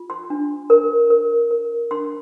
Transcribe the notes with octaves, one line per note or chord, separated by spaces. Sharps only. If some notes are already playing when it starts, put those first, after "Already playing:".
Already playing: F4
C6
D4
A#4
A#4
A#4
D4 C6